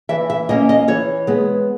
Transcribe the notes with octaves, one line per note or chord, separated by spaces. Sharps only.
E3 E5
E5
A#3 C#4 D#5
D#5
E3 C#5
G#3 B3